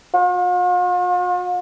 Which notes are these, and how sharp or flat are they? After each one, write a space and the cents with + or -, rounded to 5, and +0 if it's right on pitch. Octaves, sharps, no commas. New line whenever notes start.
F4 +45